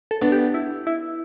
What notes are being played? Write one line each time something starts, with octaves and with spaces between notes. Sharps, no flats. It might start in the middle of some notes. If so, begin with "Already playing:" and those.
A4
B3 D4
G4
E4
E4